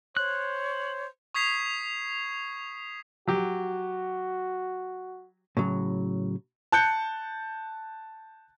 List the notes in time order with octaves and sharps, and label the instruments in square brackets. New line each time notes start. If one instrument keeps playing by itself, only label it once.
[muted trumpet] C5 [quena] C#5 [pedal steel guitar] F#6
[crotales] C#6 D#6 G#6 B6 C7 F7
[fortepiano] F#3 G4 [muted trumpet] F#4
[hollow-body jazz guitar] A2 C#3 F#3
[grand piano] A5 F#6 G6 C#7